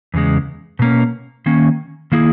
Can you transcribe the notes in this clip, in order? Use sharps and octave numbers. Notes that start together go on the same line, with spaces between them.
E2 C#3 G#3
B2 A#3 C#4
D#3 A#3 C#4
D#3 A#3 E4 G#4